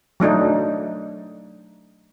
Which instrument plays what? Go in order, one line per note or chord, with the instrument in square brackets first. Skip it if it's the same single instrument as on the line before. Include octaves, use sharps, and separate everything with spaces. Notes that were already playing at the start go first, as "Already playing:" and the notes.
[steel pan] F#3 A3 D4 D#4